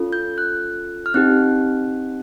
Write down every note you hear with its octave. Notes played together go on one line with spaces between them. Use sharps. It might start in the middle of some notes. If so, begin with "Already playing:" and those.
Already playing: C#4 F4 A4
G6
F#6
F6
C4 D#4 G4 F#6